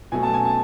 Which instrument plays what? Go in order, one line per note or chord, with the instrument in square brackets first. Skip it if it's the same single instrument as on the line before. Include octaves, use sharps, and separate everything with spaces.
[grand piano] B2 F#3 A3 G#5
A5
G#5
A5